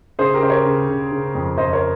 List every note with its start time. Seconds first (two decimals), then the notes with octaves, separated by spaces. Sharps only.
0.19 C#3 G#4 C5
0.34 G4 A#4
0.42 C#3 C5
0.50 A#4 C#5
0.65 C#3
0.88 C#3
1.12 C#3
1.35 F2
1.58 F2 C5 D#5
1.73 A#4 C#5